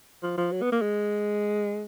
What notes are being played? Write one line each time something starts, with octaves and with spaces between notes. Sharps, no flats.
F3
F3
F#3
B3
A#3
G#3